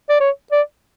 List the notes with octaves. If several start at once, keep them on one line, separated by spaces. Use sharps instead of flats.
D5
C#5
D5